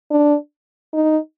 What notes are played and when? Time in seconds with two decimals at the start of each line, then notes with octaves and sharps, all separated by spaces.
0.11 D4
0.93 D#4